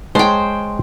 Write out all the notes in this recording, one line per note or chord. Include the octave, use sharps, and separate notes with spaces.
G#3 C5 C#5 G5 A5